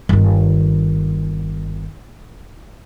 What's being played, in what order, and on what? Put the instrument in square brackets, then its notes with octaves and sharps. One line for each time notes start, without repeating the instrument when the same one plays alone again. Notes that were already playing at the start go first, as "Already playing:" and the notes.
[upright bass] G1 D#3